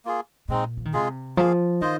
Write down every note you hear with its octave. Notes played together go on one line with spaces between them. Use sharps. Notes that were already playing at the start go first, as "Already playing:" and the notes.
A#3 F4 G#4
A#2 G#3 C4 D#4
F3
D#3
C3 G#3 F4 G#4
F3 A#3 G#4 F5
D#3 F4 C5 D#5